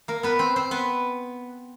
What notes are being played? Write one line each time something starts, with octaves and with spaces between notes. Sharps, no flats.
A#3 A#4
B3 B4
C4 C5
C4 C5
B3 B4